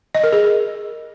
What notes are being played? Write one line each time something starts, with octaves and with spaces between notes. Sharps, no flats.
D#5
A#4
G#4